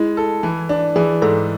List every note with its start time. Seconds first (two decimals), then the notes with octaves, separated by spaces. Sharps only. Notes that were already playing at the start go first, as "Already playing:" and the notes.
Already playing: G#3 E4
0.17 A4
0.43 E3
0.69 D4
0.96 E3 G#4
1.22 G#2 A4